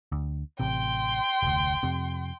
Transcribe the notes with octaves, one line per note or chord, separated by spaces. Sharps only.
D2
A1 C3 G5 C6
F1 D2
F2 C3